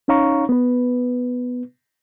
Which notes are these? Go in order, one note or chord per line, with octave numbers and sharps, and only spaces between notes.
C#4 D#4 C#5 F5 A#5 C#6
B3 B4